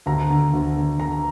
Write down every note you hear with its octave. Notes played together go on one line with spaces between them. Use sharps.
D2 A#5
D3
D2
D3
D3 A#5